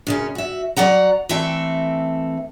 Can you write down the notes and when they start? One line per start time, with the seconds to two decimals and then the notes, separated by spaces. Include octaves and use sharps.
0.07 F#2 C#3 C#4
0.35 F#4 E5
0.77 F#3 D5 F#5 A#5
1.29 E3 A3 C4 A4 E5 G5